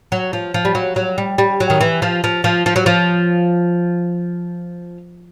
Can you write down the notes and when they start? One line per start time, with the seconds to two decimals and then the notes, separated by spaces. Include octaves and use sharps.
0.12 F#3
0.33 F3
0.54 F3
0.65 G3
0.75 F#3
0.96 F#3
1.18 G3
1.38 G3
1.60 F#3
1.70 D#3
1.81 E3
2.02 F3
2.24 F3
2.44 F3
2.66 F3
2.76 F#3
2.86 F3